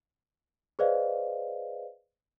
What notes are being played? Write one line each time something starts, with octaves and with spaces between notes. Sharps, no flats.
G#4 B4 C5 D5 D#5 F5